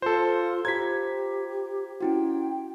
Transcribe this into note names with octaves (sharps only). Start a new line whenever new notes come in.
F4 A4 C5
F4 G4 C5 A#5 G#6 B6
C#4 E4 F#4 G5